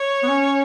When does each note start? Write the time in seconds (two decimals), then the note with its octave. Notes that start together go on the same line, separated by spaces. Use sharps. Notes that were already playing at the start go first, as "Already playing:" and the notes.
Already playing: C#5
0.23 B3
0.28 C#4